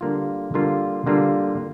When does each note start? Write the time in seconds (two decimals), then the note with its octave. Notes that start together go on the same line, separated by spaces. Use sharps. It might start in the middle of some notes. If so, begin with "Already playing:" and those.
0.01 D3 G3 A#3 F4
0.54 D3 G3 A#3 F4
1.07 D3 G3 A#3 F4